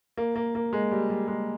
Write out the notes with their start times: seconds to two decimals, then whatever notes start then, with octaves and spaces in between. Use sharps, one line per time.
0.17 A#3
0.36 A#3
0.55 A#3
0.73 G#3
0.91 G3
1.10 G3
1.28 G#3